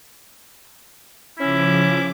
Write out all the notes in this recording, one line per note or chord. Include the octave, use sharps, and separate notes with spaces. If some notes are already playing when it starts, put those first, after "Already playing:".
C#3 F3 C#4 E4 D6